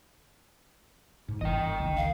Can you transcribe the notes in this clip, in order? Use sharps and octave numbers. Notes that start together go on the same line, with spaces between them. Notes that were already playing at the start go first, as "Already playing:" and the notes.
G#2
G1 E3 D#5 G5
C#2 D#3 A#3
F5